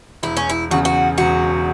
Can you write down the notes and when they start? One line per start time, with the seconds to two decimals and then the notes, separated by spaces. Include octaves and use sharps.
0.23 E1 E4
0.37 C#4
0.49 E4
0.71 E2 C#3 F#4
0.85 F#4
1.18 E1 F#4